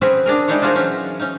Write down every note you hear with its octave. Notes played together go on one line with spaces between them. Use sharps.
C4 C#4 F#4 G#4 B4
D4 G#4 A#4
G3 G#3 D#4 E4 G#4 C#5
D4 F4 F#4 G#4 A#4 C5
E3 F#3 C#4
C#4 D#4